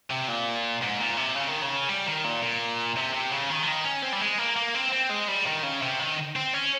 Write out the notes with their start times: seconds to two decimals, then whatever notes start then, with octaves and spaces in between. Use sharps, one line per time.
0.10 C3
0.28 A#2
0.82 G#2
1.00 A#2
1.17 C3
1.35 C#3
1.48 D#3
1.62 C#3
1.89 G3
2.07 D#3
2.24 A#2
2.43 A#2
2.96 C3
3.14 C3
3.32 C#3
3.50 D#3
3.63 F3
3.68 D#3
3.85 C#4
4.03 C4
4.13 G3
4.21 G#3
4.38 A#3
4.56 A#3
4.75 C4
4.93 C4
5.10 G#3
5.28 G3
5.46 D#3
5.63 C#3
5.82 C3
6.00 D#3
6.36 C4
6.53 C#4